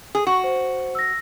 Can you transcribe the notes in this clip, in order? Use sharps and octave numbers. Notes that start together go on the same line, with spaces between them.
G#4
F#4 C#6
C5
E6 A#6